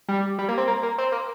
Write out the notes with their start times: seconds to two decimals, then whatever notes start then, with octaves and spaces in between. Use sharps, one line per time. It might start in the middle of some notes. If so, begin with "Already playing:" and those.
0.09 G3
0.39 G3
0.48 A#3
0.58 C4
0.68 A#3
0.83 A#3
0.98 C4
1.12 A#3